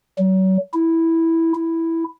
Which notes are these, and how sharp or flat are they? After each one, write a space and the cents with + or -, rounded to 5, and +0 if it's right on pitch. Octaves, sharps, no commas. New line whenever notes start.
F#3 +35
E4 -5
E4 +0